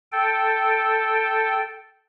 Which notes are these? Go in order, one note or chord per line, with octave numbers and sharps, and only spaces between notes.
A4 G5